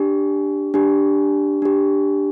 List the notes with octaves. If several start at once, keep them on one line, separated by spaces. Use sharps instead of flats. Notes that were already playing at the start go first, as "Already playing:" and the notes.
Already playing: D4 G4
D4 G4
D4 G4